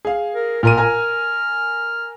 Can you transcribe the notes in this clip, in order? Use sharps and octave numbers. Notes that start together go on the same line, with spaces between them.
G#4 F5
A#4
A#2 A#4 F6 D#7
A#4 G#5 A#5